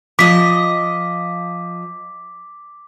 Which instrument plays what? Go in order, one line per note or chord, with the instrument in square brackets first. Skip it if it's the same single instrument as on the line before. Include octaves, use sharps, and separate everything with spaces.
[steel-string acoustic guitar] F3 D#5 [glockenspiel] D6 B6